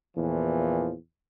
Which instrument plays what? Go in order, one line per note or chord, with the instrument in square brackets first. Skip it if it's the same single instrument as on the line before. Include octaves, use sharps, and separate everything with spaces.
[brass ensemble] E2 A#2 E3 F3